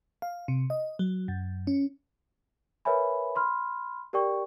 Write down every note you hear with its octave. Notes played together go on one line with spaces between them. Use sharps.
F5
C3
D#5
F#3
F#2
C#4
A#4 B4 C#5 E5 G#5 B5
B5 C6 F6
G4 A#4 D5 G5 C#6